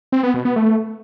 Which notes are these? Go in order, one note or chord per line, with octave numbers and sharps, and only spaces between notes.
C4
B3
B2
B3
A3